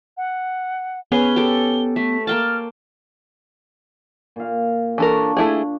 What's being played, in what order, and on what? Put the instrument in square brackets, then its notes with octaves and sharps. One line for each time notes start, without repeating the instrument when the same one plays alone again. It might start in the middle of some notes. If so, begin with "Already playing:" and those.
[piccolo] F#5
[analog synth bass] B3 [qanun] C#4 G#4 B4 [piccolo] G7
[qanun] G4 A4
[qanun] A3 [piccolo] B6
[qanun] A#3 G5 A5 [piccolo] F6
[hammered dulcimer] A#2 F5
[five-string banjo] E3 A4 A#4 [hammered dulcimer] D4 C#5
[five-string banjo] A3 E4 G#4